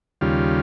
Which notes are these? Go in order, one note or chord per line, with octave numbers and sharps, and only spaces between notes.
D#2 C#3 G3 F4